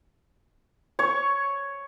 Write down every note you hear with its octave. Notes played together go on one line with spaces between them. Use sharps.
C#5 C#6